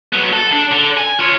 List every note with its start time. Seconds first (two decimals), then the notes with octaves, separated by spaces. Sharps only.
0.13 F#3 B3
0.33 A4
0.52 D4
0.71 D3
0.97 G#5
1.19 F4 C#5